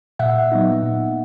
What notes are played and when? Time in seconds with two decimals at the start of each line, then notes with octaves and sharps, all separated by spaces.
0.19 A#2 E5 F#5
0.52 F#3 B3 D#4
0.83 A#2